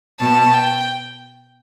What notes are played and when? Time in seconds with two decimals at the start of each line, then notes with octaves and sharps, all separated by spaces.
0.20 B2 A5
0.54 G5